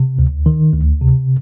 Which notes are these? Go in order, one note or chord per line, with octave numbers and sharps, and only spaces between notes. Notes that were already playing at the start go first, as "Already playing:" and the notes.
Already playing: C3
D2
D#3
D2
C3